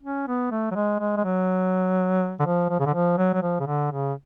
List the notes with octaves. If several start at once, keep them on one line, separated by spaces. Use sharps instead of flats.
C#4
B3
A3
F#3
G#3
G#3
G#3
F#3
D3
F3
F3
C#3
D3
F3
F#3
F#3
F3
C#3
D3
C#3